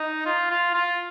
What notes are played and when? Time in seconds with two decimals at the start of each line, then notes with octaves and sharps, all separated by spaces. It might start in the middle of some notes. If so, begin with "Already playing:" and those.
Already playing: D#4
0.26 F4
0.51 F4
0.74 F4